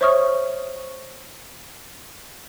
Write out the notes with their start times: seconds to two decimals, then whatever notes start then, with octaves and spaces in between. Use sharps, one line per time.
0.01 C5 C#5 E5 C#6 D#6 F6